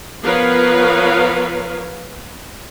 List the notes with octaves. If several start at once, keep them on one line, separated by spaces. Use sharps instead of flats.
F3 B3 A#4 B4 C#5 F5